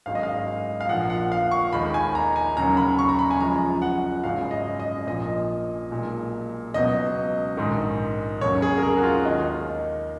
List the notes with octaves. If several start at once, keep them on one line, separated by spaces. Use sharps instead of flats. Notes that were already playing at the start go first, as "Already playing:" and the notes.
G#1 F#2 D#3 G#3 F5
D#5
F5
F5
A#1 A#2 F3 F#5
F#5
F5
C#6
D#2 D#3 G#3 B5
G#5
A#5
G#5
D#2 C#3 F#3 A#5
B5
C#6
A#5
B5
G#5
F#1 F#2 F3 G#3 A#5
F#5
G#1 F#2 C#3 G#3 F5
D#5
D#5
A#1 A#2 F3 D#5
B1 A#2 G#3
C#2 B2 F#3 D#5
A#1 G#2 D#3
F1 D#2 C#3 F#3 C#5
G#4
A#4
G#4
F#4
F4
D#2 D#3 G#3 D#4